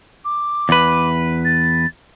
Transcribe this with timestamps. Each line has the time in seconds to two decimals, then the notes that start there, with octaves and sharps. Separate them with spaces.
0.25 D6
0.69 E2 B4
1.45 A6